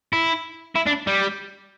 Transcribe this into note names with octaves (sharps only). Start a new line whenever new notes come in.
E4
E4
D4
G3